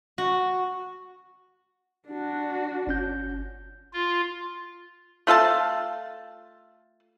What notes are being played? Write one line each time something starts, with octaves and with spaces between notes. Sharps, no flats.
F#4
D4 F#4
G1 C#4 G6
F4
A3 F4 A4 A5